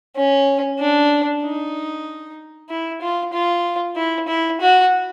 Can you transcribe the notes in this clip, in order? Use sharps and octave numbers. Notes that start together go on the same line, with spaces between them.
C#4
D4
D#4
E4
F4
F4
E4
E4
F#4